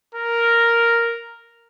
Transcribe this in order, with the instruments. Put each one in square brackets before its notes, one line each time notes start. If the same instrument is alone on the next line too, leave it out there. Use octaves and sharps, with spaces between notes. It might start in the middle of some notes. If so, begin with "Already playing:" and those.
[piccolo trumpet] A#4